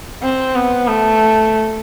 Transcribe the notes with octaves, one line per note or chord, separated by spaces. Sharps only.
C4
B3
A3